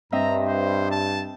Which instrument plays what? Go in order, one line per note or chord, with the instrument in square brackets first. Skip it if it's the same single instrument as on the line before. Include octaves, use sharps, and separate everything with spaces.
[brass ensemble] G2 [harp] C4 D#5 E5 [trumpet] A#5
[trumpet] C5
A5